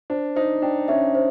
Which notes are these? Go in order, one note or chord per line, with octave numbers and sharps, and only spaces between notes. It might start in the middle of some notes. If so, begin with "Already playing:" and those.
D4 C5
D#4 C5
D4 G5
C#4 E5
C5